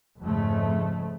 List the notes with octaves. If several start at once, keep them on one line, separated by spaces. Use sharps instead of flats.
F2 G#2 C#3 A3